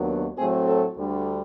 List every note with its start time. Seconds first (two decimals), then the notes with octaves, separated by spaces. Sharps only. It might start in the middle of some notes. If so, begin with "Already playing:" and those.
Already playing: D#2 D#3 F#3 B3 D4
0.37 A2 F#3 A3 C4 G#4
0.67 A4
0.97 D2 D3 G3